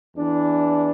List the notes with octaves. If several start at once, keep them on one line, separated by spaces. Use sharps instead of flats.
E2 E3 D4